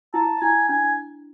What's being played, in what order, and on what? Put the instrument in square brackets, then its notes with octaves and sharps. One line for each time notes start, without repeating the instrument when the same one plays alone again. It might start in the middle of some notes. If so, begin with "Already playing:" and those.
[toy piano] E4 [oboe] A5
[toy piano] E4 [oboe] G#5
[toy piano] D4 [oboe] G#5